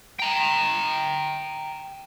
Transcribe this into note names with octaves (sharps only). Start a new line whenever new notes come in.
G5 A#5